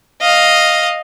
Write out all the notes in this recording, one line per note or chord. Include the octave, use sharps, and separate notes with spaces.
D#5 F5